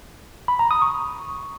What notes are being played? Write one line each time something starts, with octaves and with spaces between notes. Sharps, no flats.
B5
A#5
D#6
C#6